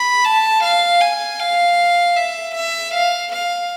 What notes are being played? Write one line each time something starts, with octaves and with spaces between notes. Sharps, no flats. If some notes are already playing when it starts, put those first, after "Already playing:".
Already playing: B5
A5
F5
G#5
F5
E5
E5
F5
F5